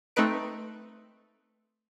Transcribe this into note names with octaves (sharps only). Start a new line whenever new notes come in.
A3 C4 D#4 B4 D7